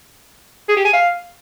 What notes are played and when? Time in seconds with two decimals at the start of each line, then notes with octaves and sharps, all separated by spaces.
0.69 G#4
0.77 G4
0.85 G#5
0.93 F5